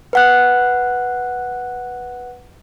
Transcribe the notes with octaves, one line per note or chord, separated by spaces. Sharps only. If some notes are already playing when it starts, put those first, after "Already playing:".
B4 F#5 F#6